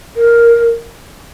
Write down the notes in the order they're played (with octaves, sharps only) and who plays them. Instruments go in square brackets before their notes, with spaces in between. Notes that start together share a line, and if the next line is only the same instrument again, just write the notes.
[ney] A#4